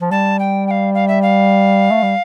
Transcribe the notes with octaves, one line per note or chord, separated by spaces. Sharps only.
F3
G3 A5
G5
G5
F5
F5
E5
F5
A3
G3